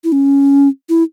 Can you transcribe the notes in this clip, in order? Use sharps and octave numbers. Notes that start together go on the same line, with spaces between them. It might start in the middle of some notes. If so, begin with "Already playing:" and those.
E4
C#4
E4